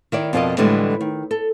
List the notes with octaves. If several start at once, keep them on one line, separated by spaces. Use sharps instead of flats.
D#3 E4 D5
F2 B2 F4 A#4 D5 D#5
A2 D3 E3 G3 G#3
D#3
A4